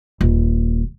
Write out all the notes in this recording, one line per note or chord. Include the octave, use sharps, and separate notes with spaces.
D#1